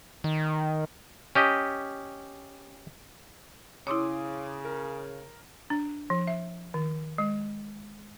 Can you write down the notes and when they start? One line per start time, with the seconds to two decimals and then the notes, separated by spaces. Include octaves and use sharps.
0.24 D#3
1.35 C#4 G4 D#5
3.87 C#3 E4 C#5 C6 D6 D#6
4.64 A#4
5.70 D4
6.10 F3
6.27 E5
6.74 D#3
7.18 G#3